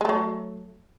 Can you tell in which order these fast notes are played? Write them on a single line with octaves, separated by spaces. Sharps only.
G#3 A3 F#3